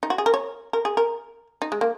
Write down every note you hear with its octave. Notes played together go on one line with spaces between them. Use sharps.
D#4
F#4
G#4
A#4
C#5
A#4
G#4
A#4
D#4
G#3
A#3